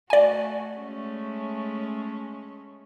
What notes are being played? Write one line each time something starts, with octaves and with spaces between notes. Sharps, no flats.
A3 F#4 D5 G#5
G#3 A3 C#4